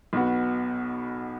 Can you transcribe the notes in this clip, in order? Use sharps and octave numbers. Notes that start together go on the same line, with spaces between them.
B1 B2 B3 F#4